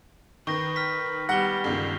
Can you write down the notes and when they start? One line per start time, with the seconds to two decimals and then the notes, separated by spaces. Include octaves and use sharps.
0.47 D#3 B4 C#6 A#6
0.76 F6 B6
1.29 G3 B3 F#5 A#6 G7
1.64 G1 C#2 D#3 F4